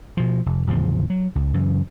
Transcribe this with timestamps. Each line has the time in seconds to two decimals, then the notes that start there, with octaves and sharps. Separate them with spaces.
0.17 B2 F3
0.46 F1
0.67 D1 E2 C#3 F3
1.10 F#3
1.35 C#2
1.54 F#2 C#3 E3